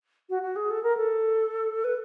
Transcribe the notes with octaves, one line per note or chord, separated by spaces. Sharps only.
F#4
F#4
G#4
A4
A#4
A4
B4